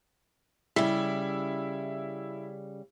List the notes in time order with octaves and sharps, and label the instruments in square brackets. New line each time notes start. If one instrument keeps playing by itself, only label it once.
[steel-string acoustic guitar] C#3 G3 [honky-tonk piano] E4